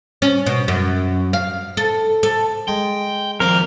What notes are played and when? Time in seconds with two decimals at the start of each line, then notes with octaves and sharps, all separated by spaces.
0.22 C#4
0.46 B2
0.68 F#2
1.33 F5
1.77 A4
2.23 A4
2.68 G#3 G5
3.40 F2 D#3 C4 A#4 D5